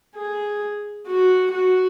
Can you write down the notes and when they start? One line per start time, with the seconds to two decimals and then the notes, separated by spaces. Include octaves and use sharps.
0.15 G#4
1.07 F#4
1.52 F#4